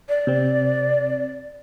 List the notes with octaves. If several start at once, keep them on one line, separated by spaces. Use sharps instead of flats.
D5
C3 C4